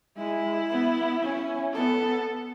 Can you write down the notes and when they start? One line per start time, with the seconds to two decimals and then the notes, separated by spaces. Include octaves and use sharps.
0.17 G#3 E4
0.70 B3
1.22 C#4
1.73 B3 A4